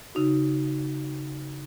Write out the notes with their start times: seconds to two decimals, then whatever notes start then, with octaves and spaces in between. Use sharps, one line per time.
0.15 C#3 D#4 F#4